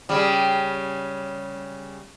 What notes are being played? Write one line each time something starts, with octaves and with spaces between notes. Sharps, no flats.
C#3 G3